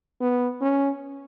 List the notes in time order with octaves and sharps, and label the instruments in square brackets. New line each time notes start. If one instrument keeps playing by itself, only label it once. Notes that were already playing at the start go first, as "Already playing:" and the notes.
[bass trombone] B3
C#4